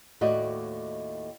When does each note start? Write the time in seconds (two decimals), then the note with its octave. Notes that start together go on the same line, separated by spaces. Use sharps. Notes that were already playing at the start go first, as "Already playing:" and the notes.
0.21 D#2 A2 A3 F#4 D5 D#5